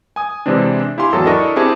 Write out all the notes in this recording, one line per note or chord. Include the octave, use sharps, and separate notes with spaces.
G#5 D#6
C3 E3 G#3 C4 D4
E4 G4 F5 G#5 C6
G#1 E2 F#3 A4 A5
D4 E4 A4 A#4 D#5 C#6
C4 E4 G4 G#4 A5